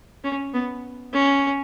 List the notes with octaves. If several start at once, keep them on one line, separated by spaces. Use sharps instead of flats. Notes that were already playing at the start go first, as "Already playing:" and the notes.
C#4
B3
C#4